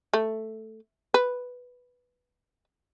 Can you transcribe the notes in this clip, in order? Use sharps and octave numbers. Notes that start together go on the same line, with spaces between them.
A3
B4